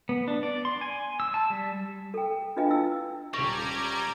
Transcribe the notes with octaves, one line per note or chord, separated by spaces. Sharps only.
B3
D4
D5
C6
G#5
E6
A5
G3
A4 G5
D4 F4 B4 D#5 F5 G5
E4 F4 E6
D#1 G3 A#5 C#6 D6 G#6 A#6